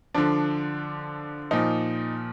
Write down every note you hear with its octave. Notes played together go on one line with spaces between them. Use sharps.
D3 F3 D4
A#2 F3 D#4